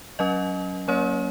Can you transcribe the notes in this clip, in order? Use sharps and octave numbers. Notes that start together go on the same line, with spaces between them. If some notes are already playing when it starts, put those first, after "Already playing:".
F#3 C#4 D#5
F#3 A#3 C#4 C#5